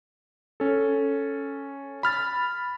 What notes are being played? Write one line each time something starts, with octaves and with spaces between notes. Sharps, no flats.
C#4 A4
B5 F6 A6